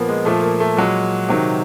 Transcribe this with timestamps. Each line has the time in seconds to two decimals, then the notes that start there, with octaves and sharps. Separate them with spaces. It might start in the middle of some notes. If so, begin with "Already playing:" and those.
Already playing: A#2 F3 A#3 B3
0.09 G#3
0.25 A#2 F3 A3
0.42 A#3
0.60 A3
0.77 A#2 F#3 G#3
1.28 C3 D#3 F#3